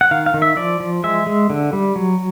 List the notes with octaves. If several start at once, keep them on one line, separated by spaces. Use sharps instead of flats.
F#5
D#3 F5
F5
D#3
E5
F3 D5
F3
G#3 E5
G#3
D3
G3
F#3